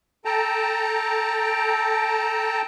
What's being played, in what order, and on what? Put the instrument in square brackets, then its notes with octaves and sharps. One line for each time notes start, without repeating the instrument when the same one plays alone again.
[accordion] A4 G5 A5 A#5